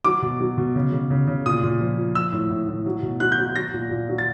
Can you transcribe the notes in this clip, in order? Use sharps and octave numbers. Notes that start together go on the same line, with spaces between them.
F#3 D6
B2
F#3
B2
C#3
C#3
C#3
C#3
A#2 D#6
A#2
F3
F3
F3 E6
A2
A2
A2
F#3
B2
F#3 F#6
G6
F#3
F#3 A#6
A#2
A#2
F#3
A6